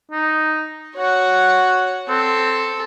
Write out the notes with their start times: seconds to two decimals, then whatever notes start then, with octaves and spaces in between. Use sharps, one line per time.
0.11 D#4
0.96 F#4 C#5 F#5
2.08 C4 A4